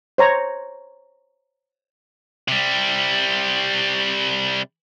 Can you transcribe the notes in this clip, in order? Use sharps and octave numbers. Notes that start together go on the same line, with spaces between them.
C5 C#5 A#5
C3 G3